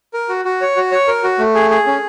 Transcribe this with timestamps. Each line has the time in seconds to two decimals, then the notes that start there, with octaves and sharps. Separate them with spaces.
0.14 A#4
0.29 F#4
0.45 F#4
0.61 C#5
0.76 F#4
0.92 C#5
1.08 A#4
1.24 F#4
1.39 A3
1.55 G#4
1.71 G#4
1.87 C#4